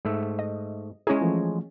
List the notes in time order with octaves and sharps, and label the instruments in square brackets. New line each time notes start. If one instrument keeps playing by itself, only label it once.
[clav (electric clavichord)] G#2 A3 E5
[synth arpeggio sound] D#5
[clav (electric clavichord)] G#3 C#5 A#5 [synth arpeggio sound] C#4 G#4 [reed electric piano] E4
[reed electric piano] E3 F3 A3